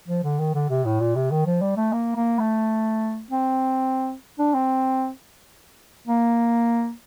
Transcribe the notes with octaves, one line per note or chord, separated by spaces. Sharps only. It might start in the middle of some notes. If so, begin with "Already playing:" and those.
F3
D3
D#3
D3
C3
A2
A#2
C3
D#3
F3
G3
A3
A#3
A#3
A3
C4
D4
C4
A#3